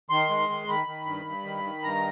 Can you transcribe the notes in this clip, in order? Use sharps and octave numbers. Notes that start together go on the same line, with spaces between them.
D#3 C6
G#3
D#3
D#3 B5
D#3
G2
G2
D#3
D#3
G2 A#5